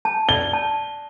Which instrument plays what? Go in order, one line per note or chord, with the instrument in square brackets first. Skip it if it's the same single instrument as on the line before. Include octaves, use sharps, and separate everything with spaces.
[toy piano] A5
[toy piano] D5 [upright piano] G7
[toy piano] A5